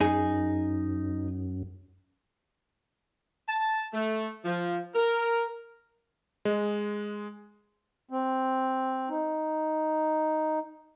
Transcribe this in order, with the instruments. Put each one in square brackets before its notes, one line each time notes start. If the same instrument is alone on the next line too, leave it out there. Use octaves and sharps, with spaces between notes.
[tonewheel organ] F#2 [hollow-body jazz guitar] D#4 G#4
[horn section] A5
A3
F3
A#4
[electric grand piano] G#3
[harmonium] C4
D#4